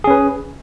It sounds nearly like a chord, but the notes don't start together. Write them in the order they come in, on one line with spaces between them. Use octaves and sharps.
G#4 C#4 B4